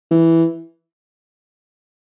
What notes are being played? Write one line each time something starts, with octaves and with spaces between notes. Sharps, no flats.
E3